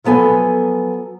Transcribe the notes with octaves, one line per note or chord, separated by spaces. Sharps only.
F3 F#3 B3 A4 G#5